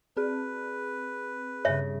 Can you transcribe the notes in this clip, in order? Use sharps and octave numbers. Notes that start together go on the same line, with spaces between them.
C4 G#4 B4
G2 C#3 C#5 E5